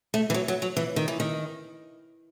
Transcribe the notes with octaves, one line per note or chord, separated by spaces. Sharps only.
A3
E3
F#3
F#3
F#3
E3
D#3
E3
D#3